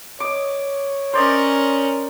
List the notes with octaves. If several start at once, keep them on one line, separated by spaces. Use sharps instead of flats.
C#5 D#5 D6
C#4 A#4 C5 D5 D#5